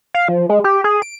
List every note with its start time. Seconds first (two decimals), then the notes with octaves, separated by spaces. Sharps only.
0.14 F5
0.28 F3
0.49 G#3
0.64 G4
0.84 G#4
1.02 D7